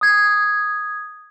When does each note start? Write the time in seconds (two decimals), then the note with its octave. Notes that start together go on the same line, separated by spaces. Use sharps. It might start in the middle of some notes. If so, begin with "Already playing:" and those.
0.01 D#6 G#6